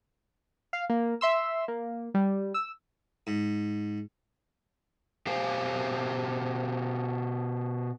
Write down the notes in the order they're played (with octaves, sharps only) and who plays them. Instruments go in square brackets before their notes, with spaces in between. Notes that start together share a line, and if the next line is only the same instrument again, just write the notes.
[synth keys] F5
A#3
E5 C6 E6
A#3
G3
E6
[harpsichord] G#2
[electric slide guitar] B2 G4 C5 F5